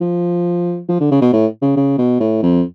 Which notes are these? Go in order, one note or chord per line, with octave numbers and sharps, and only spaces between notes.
F3
F3
D3
C#3
B2
A2
C#3
C#3
B2
A2
F2